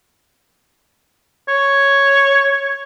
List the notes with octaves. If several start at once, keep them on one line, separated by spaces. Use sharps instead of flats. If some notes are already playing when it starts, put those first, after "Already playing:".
C#5